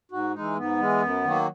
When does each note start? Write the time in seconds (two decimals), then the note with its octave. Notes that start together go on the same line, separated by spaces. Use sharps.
0.11 G#2 F#4
0.34 E3 G#3 D#4
0.57 G#2 B3
0.80 E3 G#3
1.02 F#2
1.24 D#3 F#3 A#3